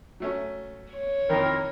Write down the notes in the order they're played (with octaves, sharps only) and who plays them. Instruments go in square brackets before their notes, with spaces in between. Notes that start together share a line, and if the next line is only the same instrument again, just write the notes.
[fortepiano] F#3 A3 C#4
[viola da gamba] C#5
[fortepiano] F2 D#3 [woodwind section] C4 E4 A#4